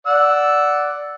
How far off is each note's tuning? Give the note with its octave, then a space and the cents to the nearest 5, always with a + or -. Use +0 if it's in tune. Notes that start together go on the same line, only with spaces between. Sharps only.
D5 -5 F#5 +0 E6 +0